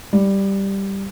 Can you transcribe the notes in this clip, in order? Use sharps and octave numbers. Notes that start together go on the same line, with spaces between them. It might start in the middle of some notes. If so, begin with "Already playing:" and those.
G3